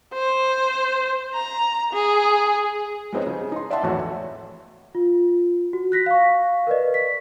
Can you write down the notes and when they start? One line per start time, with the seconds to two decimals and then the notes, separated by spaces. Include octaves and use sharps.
0.14 C5
1.34 A#5
1.93 G#4
3.13 G#3 B3 C4 D#4 C#5
3.27 C#3
3.52 D#4 C6
3.71 D5 E5 F#5 G5 A5 C6
3.83 G#1 E2 A2 A3 F#4 C#5
4.95 F4
5.73 F#4
5.92 F#6 A#6 B6
6.06 F5 C#6
6.67 A#4 B4 D5 D#5
6.94 B6